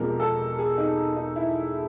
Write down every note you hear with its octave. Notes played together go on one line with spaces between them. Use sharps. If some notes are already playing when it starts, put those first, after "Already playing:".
Already playing: E1 E2 C3 F3 G#3 A#4
A4
G#4
D#4
D#4
E4